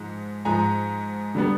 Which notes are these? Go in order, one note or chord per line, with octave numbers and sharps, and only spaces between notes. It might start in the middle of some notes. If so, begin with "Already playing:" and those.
Already playing: G#2 F3 G#3
G#2 F3 G#3 G#5 A#5
D3 G3 B3